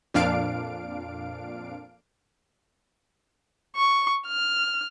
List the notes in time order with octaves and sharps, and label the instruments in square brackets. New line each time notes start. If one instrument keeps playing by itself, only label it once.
[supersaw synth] F2 A#2 D4 F5 D7
[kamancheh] C#6
F6